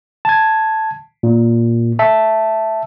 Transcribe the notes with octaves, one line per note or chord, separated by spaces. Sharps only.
A5 G#6
A#2
E5 A5